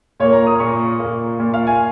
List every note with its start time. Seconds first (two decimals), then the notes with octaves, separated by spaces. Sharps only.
0.20 A#2 A#3 C#5
0.33 A#5
0.47 D#6
0.60 A#2 A#3 C#6
0.99 A#2 A#3
1.39 A#2 A#3
1.54 F5
1.67 G#5